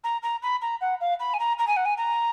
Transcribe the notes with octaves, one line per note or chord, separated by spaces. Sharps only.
A#5
A#5
B5
A#5
F#5
F5
B5
G#5
A#5
A#5
G#5
F#5
G#5
A#5